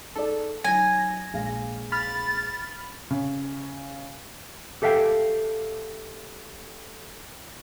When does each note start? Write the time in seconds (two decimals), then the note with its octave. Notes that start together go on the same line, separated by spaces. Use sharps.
0.16 D#4 G#4 A4 D5
0.64 F#3 D#4 G#5 A#6
1.33 A#1 G#3 F5
1.92 B5 F6 A6
3.11 C#3
4.82 G4 A4 E5 F5 G5